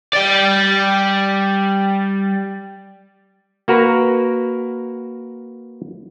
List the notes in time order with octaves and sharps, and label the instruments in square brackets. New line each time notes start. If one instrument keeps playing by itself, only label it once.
[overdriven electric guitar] G3 D5
[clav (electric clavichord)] A#3 F#4 A#4 B4